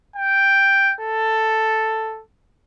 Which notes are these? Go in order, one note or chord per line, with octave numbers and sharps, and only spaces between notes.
G5
A4